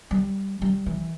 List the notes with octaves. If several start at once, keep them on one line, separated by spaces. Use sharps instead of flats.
G3
G3
E3